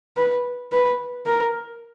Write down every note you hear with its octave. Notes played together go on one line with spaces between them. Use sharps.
B4
B4
A#4